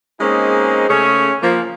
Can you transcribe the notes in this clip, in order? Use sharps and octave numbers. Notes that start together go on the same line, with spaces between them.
G#3 A#3 C4 C#4 D#4 G#4
C#3 A3 C#4 G#4 C#5 G#5
F3 A#3